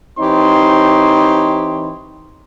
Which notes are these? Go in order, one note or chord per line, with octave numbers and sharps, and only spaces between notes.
E3 C4 D#4 G4 C#5 C6